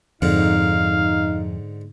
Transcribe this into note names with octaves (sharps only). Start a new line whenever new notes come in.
F2 G#2 D3 D#4 F5